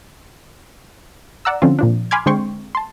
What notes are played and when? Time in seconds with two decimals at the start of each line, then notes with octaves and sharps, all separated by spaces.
1.45 D5 F#5 A#5 E6
1.62 D3 F3 C4 C#4 F4
1.79 A#2 F3 D4
2.11 G#5 B5 C6 D6 F6 G#6
2.26 D3 G#3 C4 G5 C6 C#6
2.75 A5 C6